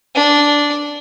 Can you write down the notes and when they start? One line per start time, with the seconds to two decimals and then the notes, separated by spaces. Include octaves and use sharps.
0.15 D4